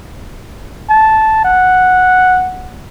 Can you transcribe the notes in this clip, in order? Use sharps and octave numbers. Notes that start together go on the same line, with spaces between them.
A5
F#5